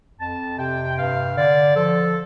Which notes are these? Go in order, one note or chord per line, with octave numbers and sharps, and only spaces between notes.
F2 A5
C3 G5
G2 F5
D3 D5
F3 A4